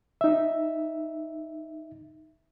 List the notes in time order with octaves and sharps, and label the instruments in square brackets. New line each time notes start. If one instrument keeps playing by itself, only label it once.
[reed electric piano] D#4 E5